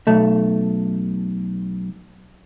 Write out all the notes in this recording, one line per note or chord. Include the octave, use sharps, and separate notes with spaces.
B1 A3